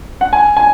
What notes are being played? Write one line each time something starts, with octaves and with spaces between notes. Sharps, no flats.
F#5
G#5
G#5